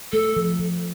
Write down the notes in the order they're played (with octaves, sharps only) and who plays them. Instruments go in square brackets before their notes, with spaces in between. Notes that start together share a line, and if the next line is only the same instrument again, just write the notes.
[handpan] A3 [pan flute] A4
[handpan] F3
F3